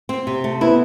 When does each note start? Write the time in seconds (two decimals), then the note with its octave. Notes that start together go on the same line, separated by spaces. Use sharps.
0.09 C4
0.27 C3
0.44 A3
0.61 B3 E4